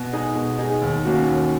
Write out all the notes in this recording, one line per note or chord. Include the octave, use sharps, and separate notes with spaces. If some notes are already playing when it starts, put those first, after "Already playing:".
Already playing: B2
G#3 D#4 G#4
B2
G#3 D#4 G#4
D#2
D#3 A#3 C#4 F#4
D#2